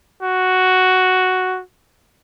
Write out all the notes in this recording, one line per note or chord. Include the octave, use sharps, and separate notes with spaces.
F#4